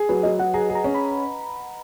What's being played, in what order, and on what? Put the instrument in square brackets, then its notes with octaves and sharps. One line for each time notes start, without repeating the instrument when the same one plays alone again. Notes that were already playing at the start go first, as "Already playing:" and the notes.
Already playing: [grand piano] G#4
[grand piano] F#3 [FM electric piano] B4
[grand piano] F#3 [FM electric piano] D#5
[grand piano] F#3 [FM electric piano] F#5
[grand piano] G#4 [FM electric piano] A#5
[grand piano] G#4
[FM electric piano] A#5
[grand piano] C#4
[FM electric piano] B5